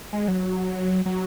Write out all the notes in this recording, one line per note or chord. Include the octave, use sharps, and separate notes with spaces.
G#3
F#3
F#3